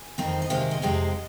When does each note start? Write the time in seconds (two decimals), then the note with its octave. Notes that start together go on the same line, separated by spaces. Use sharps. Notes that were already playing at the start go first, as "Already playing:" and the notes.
Already playing: G#5
0.18 F2 D#3 C4 D#4
0.42 D#5
0.50 C3 D#3 G#3 C4 F5
0.71 D#5
0.82 F2 C3 G#3 C4 D#4